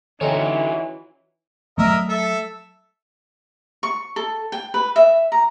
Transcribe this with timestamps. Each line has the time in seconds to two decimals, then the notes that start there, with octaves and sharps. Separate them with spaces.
0.21 D3 E3 C#4 D#4 F4 F#4 C#5 G5
1.78 F#3 A3 A#4 D#5 E5
2.09 A4 E5
3.83 C#6
4.16 A4
4.52 G5
4.74 B4
4.96 E5
5.32 A#5